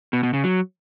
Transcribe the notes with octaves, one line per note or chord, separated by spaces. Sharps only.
B2
B2
C#3
F#3